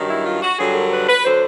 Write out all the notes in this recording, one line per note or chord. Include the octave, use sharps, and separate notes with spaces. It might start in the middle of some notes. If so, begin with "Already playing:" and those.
Already playing: G2 D#3 F#3
E4
F4
F#4
G2 D3 F#3 G#4
A#4
B4
B4
D3 F#3 C5